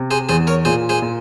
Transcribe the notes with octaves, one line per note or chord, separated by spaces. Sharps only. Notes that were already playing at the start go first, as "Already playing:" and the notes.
Already playing: C3
G#4 C5
E2 G#4 C5
A#4 C#5
A#2 G#4 C5
G#4 C5
A#2